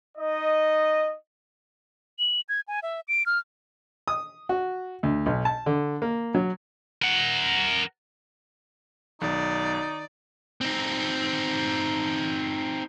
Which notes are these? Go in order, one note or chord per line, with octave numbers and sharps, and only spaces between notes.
D#4 D#5
F#7
G#6
G#5
E5
D7
F6
D#6
F#4
D2
B1
A5
D3
A#3
F#3
A#4 F#5
B1 D#3 D#4 D5
C4 D#4